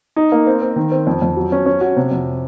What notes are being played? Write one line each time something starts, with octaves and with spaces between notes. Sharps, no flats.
D#4
A#3
C4
C4
D#3
C4
F2
F2
F#3
C#4
C#4
F#4
C3
F2